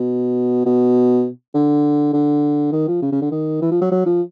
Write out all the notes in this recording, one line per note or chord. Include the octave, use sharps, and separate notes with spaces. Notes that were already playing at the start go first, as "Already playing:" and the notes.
Already playing: B2
B2
D3
D3
D#3
F3
C#3
C#3
D3
D#3
E3
F3
F#3
F#3
F3